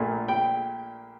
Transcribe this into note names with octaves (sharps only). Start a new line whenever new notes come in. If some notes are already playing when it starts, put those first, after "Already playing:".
Already playing: A#1 A#2 A3 D4
G5